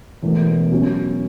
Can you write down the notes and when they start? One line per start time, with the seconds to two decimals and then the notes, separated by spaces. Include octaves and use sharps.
0.22 E1 E2 B2 A3
0.72 B2 F#3 C#4